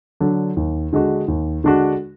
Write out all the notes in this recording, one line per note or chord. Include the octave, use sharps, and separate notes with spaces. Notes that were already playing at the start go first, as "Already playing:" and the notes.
D3 F#3 D4
D#2
D3 G#3 D4 F#4
D#2
D3 G#3 D4 F#4